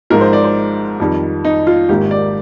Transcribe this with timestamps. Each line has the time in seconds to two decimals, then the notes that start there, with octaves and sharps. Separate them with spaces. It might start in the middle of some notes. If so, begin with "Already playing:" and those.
0.10 G#1 G#2 F3 G#3 A#4
0.21 C5
0.33 D5
0.44 C5
1.00 F2 D#3 G3
1.45 D#4
1.67 F4
1.89 G#1 G#2 D#3 A#3 G4
2.11 D5